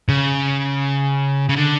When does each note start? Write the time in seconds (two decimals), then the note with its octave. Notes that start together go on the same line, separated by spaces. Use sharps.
0.08 C#3
1.49 C#3
1.56 D3